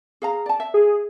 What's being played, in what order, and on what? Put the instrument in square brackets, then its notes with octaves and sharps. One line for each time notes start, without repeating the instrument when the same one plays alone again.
[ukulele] G#4 F5 A#5
D5 A5
E5
[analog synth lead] G#4